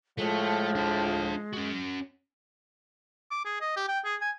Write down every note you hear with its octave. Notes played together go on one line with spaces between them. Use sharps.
A2 F3 G#3 A3
D4 E5
C#4 F#4
D6
G#4
D#5
G4
G5
G#4
G#5